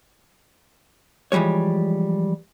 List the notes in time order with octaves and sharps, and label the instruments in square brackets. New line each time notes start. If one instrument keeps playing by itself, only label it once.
[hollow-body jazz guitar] E3 F3 G3 G#3 C#5